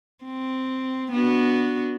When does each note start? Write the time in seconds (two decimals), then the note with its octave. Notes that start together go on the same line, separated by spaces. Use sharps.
0.24 C4
1.12 B3 D4 F#4